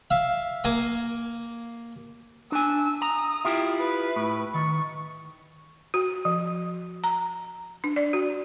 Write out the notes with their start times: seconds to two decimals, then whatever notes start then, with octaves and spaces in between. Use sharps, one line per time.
0.11 E5 F5
0.64 A#3 A#4 F5 G#5 A#5
2.52 D4 G#5 E6
3.02 A#5 D#6
3.45 E4 F4 G4
3.80 B4
4.16 A2
4.54 D#3 C#6
5.94 F#4
6.25 F3
7.04 A#5
7.84 D4
7.96 D5
8.13 F#4